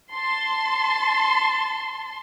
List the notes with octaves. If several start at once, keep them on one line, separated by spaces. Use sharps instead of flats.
A5 C6